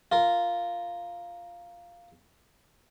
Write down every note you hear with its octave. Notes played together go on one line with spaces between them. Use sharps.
F4 A#4